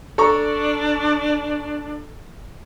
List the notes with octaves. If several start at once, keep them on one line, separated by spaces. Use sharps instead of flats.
D4 A4 A#5 C#6